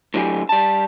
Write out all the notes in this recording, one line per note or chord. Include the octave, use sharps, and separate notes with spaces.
A2 D3 F#3 G4 G#5
G3 A5